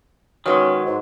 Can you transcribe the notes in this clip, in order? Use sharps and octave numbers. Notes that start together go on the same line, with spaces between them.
D#3 F#3 G#3 C#4 B4
G#2 C5